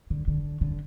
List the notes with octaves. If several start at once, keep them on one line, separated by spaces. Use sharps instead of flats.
D3
D3
D3